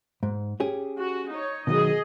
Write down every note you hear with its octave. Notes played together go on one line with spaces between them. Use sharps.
G#2
C#4 G4 G#4
F#4
D#4 C#5
B2 D#3 F#3 G#4 D#5